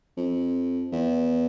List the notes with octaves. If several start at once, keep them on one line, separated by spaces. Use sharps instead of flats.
F2
E2